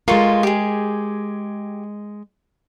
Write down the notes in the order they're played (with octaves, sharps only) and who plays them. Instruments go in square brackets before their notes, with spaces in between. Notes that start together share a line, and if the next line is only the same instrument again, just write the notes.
[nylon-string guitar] G#3 A#4 [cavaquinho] F4 A4 C#6
[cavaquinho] G4 G#4